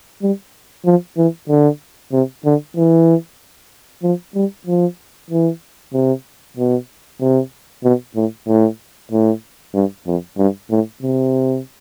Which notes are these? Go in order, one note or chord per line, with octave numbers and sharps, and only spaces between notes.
G3
F3
E3
D3
C3
D3
E3
F3
G3
F3
E3
C3
B2
C3
B2
A2
A2
A2
G2
F2
G2
A2
C3